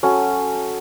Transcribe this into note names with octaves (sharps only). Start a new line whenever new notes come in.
F#3 C#4 A4